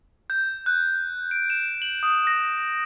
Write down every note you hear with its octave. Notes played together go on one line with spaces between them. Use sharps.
G6
F#6
D7
E7
F#7
D#6
A#6